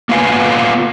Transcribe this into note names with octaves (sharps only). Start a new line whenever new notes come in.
A#3 B3 F4 F5 G#5